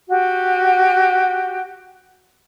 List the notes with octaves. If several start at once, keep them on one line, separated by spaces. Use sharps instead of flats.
F#4 G4